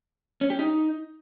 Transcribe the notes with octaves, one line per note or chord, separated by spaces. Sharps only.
C#4
G4
D#4